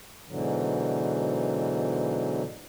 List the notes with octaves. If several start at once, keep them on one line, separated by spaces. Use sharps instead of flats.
G#2 B2 D3 E3 F#3